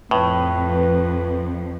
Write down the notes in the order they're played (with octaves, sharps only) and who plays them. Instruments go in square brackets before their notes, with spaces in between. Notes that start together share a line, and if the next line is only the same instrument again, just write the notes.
[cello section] F2 [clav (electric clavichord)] A2 [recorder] B4